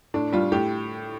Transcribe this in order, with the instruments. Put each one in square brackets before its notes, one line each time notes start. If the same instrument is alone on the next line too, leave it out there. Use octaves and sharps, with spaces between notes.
[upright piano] A2 D4
G3 F4
A2 G4